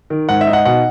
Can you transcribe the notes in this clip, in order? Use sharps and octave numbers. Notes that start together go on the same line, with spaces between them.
D#3
G#2 F#5
E5
D#4
F#5
B2 F#5